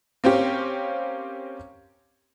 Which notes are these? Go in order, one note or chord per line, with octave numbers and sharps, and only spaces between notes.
A#3 C4 C#4 G4